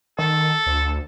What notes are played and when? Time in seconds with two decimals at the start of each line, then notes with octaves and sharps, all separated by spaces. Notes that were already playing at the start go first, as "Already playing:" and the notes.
0.19 D#3 A4
0.66 D2